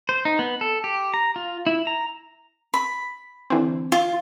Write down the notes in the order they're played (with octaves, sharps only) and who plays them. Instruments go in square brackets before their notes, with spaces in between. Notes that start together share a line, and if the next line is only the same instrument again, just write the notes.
[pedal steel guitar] C5
D#4
B3
A4
G4
A#5
F4
E4
A#5
[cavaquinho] B5
[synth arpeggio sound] D3 E3 C4
[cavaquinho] F4